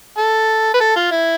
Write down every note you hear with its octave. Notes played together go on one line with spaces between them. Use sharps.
A4
B4
A4
F4
E4